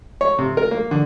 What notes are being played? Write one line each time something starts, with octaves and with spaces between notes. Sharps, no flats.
C#5
C3
A#4
A#3
D3